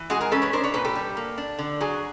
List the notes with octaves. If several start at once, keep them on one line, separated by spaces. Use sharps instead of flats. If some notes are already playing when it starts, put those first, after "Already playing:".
Already playing: E3
G#3 F#4 G#4
G#4 A#4
C#4 A4 B4
B4 C#5
D4 A#4 C5
B4 C#5
A#2 A4 B4
G4 A4
G3
A#3
D4
D3
F#3 F#4 G#4